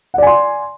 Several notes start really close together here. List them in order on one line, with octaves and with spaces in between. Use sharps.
F#5 D5 G#5 C6